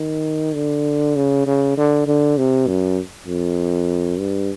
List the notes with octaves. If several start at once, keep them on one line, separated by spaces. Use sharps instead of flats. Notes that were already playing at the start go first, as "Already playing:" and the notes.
Already playing: D#3
D3
C#3
C#3
D3
D3
C3
F#2
F2
G2